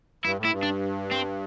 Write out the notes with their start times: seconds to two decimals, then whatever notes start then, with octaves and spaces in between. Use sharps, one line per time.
0.24 G2 E4
0.38 A2
0.45 E4
0.52 G2
0.63 D4
1.12 C4